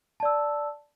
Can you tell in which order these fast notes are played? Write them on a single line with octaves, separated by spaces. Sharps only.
A5 D5 E6